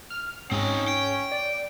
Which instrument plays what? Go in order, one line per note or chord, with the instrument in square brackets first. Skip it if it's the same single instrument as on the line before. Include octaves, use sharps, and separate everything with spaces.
[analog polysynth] F6
[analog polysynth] G#2 [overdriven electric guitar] C4 D#4 [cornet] C#4
[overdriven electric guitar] G5
[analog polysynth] D5